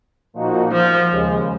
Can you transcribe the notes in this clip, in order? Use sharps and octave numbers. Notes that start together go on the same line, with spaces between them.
A#2 F3 A#3 D#4 F#4
F3
D#2 C#3 G#3